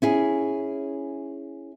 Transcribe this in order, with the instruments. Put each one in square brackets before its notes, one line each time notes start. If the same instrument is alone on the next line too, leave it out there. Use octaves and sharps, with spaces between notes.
[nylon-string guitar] C#4 E4 G#4